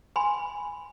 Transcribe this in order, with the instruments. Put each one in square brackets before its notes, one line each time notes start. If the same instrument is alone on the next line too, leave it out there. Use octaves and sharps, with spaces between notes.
[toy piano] G#5 B5 C6